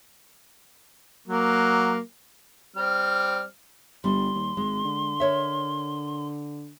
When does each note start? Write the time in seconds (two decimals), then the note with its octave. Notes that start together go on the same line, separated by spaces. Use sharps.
1.28 F#3 A#3
2.76 G3 C4 F6
4.04 G1 G3 C6
4.35 D#2
4.57 G#1 G#3
4.84 D3
5.20 A#4 C#5 E5